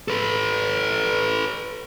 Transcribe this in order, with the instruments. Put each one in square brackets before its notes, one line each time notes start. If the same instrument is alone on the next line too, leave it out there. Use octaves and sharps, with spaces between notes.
[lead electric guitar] A4 B4